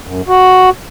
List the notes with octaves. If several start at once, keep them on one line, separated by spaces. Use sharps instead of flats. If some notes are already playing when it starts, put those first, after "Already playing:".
F#2
F#4